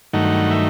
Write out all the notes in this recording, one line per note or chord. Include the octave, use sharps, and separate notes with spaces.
G2 D#3 F#3 A3 D#4 F#5
E5